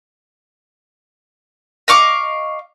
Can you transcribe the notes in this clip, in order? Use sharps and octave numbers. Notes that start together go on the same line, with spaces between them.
D#5 F5 C#6 D6